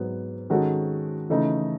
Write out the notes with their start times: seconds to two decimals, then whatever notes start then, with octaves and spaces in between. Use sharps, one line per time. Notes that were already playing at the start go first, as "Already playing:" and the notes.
Already playing: G#2 F#3 B3
0.50 D#3 G#3 C#4 F#4 A4
1.30 C#3 E3 A3 D#4 A4